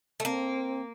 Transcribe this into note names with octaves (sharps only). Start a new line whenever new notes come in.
A3
A#3 C4